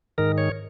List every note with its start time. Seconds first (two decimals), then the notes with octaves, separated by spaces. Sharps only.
0.18 G#2 D#3 A#4
0.38 C#5